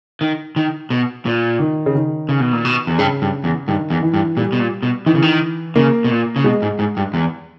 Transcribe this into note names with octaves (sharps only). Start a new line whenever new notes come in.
D#3
D#3
B2
A#2
D#3
C#3
D#3
C#3
B2
A#2
B2
E2
G2 C#3
G2
E2
G2 D#3
E2
E3
G2
A#2 G3
B2
A#2
B2
D#3 E3
C#3
D#3
C#3 A#3
B2
A#2
C#3
B2 G#3
G#2
G#2
G2
E2